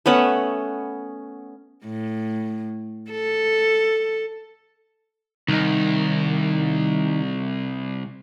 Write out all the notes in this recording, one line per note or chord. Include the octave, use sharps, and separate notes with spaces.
A3 B3 C#4 F#5
A2
A4
C2 D#3 D#4